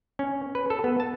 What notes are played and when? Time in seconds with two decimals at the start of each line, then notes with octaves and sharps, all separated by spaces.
0.19 C#4
0.55 B4
0.70 A4
0.84 B3
1.00 A5